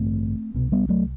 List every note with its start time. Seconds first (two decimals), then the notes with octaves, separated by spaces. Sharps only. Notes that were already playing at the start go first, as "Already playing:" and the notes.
Already playing: A1 G2 D3 A3 C4
0.54 C2 B2
0.72 G3 B3
0.89 F#3 A3